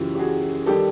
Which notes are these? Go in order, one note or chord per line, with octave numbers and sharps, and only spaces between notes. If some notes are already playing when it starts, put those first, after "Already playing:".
Already playing: F#2 C#3 E3 F4 G4
G4
F#4 G#4
D#3 G3 G4 A4